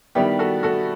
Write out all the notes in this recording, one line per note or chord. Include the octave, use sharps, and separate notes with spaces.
D#3 G3 B3 E4 G4
F#4 A4
F#4 A4